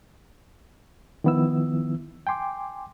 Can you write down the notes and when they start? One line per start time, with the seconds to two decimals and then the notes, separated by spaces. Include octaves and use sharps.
1.24 D#3 F3 B3 E4 E6
2.27 G5 G#5 C6 D6